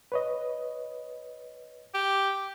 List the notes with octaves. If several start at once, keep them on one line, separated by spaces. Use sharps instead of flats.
B4 C#5 D#5
G4